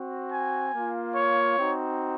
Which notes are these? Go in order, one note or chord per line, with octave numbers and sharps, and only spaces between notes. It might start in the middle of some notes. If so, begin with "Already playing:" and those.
Already playing: C4 F#4
G#5
A#3 F4
C#5
C4 D#4 F#4